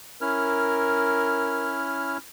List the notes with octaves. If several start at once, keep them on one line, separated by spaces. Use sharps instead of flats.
C#4 E4 A#4 F6